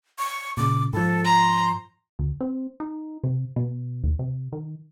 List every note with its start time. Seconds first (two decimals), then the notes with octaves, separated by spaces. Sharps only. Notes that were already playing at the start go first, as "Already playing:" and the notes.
0.19 C#6
0.57 A#2 C#3 D6
0.93 G#2 F3 A4
1.25 A#5 C6
2.19 D2
2.41 C4
2.80 D#4
3.24 C3
3.56 B2
4.04 D#2
4.19 C3
4.52 D#3